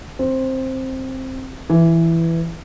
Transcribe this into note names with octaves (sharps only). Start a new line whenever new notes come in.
C4
E3